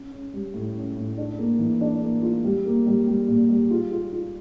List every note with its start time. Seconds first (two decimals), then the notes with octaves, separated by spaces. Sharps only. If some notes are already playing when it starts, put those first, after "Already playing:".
Already playing: C#4
0.11 C#4
0.33 G3
0.54 A2
0.76 C#4
0.97 A2
1.17 D4
1.39 A#3
1.59 E3
1.81 D4
2.01 A#3
2.22 F4
2.44 G3
2.65 A#3
2.87 G3
3.07 G3
3.27 A#2
3.49 G3
3.71 F4
3.91 F4
4.12 F4